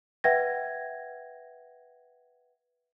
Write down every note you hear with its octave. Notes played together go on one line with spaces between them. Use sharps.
B4 E5 F#5 G5 G#6 A#6